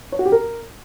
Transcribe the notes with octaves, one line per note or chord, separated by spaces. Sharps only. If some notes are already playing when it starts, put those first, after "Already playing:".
C#5
F#4
G4
A#4